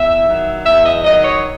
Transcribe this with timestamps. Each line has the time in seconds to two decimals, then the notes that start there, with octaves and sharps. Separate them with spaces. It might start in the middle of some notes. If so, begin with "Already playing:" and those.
Already playing: E2 E5
0.26 D#3 F#3
0.65 E2 E5
0.85 D#5
1.05 D#3 F#3 D#5
1.24 C#5